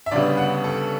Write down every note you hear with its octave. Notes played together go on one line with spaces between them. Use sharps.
E5
D2 C#3 G3 B3 D5
F#5
A4